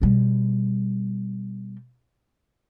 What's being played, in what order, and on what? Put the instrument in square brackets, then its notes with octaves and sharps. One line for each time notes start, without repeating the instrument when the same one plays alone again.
[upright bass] B2 G3